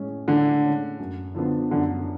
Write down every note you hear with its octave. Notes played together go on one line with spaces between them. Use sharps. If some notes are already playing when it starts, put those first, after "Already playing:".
Already playing: A2 G#3 C#4
A2 D3
G#3 C#4
F#2
D3 F3 B3 D4
F#2 D3